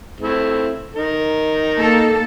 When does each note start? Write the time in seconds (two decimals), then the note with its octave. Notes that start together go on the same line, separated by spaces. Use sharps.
0.21 A3 C4 E4
0.95 D#4 A#4
1.77 A#3 A4